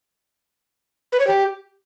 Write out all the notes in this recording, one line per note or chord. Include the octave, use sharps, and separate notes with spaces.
B4
C#5
G4